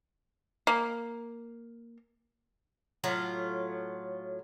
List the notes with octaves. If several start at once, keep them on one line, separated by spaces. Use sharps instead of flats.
A#3
A2 F#3 F4